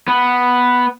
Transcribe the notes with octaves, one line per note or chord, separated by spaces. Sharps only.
B3